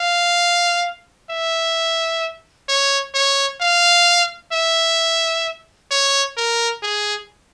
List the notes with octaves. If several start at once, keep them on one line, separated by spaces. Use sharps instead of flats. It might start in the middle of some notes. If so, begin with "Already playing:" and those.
Already playing: F5
E5
C#5
C#5
F5
E5
C#5
A#4
G#4